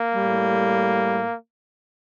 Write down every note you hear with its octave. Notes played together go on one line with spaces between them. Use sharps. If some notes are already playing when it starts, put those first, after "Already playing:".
Already playing: A#3
A2 G3